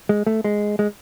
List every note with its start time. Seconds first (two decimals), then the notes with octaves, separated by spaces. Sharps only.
0.09 G#3
0.27 A3
0.44 G#3
0.79 G#3